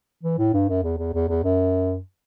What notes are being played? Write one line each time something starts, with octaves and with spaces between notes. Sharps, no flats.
E3
A2
G2
F#2
E2
E2
E2
E2
F#2